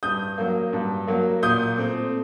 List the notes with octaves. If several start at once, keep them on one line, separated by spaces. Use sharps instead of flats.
G2 D#6 G6
F#3 A#3
G2
F#3 A#3
A#2 D#6 G6
A3 C4